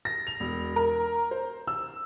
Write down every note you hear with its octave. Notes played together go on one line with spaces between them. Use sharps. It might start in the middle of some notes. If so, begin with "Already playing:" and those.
A#6
F7
E1
A#4
C5
E6